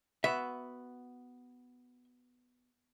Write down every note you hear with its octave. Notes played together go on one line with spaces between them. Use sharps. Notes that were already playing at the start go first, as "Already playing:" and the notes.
B3 F#4 E5